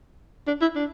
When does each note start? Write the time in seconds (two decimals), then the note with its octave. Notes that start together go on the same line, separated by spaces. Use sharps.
0.47 D4
0.61 E4
0.76 D4